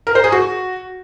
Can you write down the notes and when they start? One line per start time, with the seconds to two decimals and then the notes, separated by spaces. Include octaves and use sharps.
0.07 A#4
0.15 C5
0.24 G#4
0.32 F#4